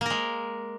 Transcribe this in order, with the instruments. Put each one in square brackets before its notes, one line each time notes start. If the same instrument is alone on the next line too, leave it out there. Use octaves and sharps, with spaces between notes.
[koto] A#3
A#4
G#3